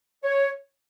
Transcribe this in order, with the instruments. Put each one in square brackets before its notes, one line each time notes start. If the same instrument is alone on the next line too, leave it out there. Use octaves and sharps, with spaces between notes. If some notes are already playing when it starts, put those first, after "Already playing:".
[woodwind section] C#5